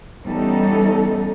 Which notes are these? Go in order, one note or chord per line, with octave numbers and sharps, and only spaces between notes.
E3 G3 B3 C#4 D#4 A4